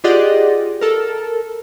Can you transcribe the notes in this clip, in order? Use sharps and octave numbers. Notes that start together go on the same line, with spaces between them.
F4 G4 G#4 D5 D#5 F#5
A4 A#4